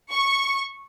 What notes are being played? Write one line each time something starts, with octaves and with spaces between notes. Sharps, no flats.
C#6